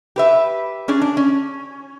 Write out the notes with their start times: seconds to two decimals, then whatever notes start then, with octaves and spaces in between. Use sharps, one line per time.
0.16 G4 B4 E5
0.88 C#4 D4 G#4
1.01 D4
1.17 C#4